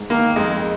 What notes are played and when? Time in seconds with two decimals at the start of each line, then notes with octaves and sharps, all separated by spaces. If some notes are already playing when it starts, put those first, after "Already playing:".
Already playing: G#2
0.10 D#3 A#3
0.36 F2 G#3